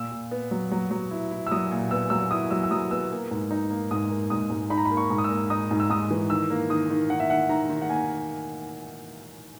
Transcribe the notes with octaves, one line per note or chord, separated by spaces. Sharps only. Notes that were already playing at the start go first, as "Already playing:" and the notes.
Already playing: A#2 E6
A#2
B3
F#3
F#3
F#3
E4
E4
E6
F#3 D#6
A#2
B3 E6
F#3 E6
E4 D#6
F#3 E6
E6
F#3 D#6
B3 E6
A#3
G#2
D#4
A#3
G#2 D#6
A#3
G#2 D#6
G#2
D#4 B5
A#5
B5
A#3
C#6
G#2
D#6
E6
A#3
D#4 D#6
G#2
E6
G#2 D#6
E3
D#3 E6
A#3
D#3 D#6
D#3
D#3 F#5
E5
D#3 F#5
D#3 A#5
D#3
F#5
A#3 G#5